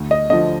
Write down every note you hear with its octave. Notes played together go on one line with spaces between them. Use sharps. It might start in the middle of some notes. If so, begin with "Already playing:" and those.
Already playing: D2
D#5
D3 F3 D#5